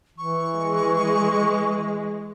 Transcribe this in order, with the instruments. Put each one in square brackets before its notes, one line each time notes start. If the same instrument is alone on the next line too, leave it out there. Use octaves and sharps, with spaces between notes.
[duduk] E3 [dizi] C#6
[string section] G#3